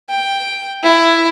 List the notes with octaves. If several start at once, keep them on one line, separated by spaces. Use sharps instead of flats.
G5
E4